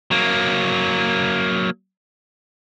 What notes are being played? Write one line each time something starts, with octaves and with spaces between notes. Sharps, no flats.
F#3 A#3